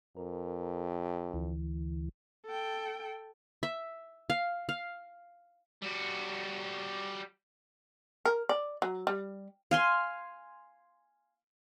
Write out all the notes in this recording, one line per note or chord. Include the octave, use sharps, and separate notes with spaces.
F2 A#4
D2 E3
A4 G5
E5
F5
F5
G3 F#4
A#4
D5
F#3
G3
F5 G#5 C6